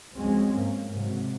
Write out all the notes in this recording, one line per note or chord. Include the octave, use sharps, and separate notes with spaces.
C#2 F3 F#3 G#3 C4 C#4
G#2 F#3 A#3
G#2 C3 F#3